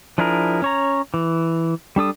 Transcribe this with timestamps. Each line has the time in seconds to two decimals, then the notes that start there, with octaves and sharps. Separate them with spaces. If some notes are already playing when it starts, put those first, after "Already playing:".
0.18 F3 D4 E4 G#4 A#4
0.62 C#4 C#5 A#5
1.14 E3
1.96 G3 D4 A4 D#6